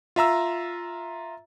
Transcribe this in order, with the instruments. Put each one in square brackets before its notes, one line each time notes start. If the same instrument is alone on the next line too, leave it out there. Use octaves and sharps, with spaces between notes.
[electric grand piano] F4 E5 A#5 E6